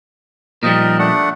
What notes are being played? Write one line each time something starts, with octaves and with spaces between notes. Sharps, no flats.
A#2 F3 G3 D#4 A#4
A3 D4 F#5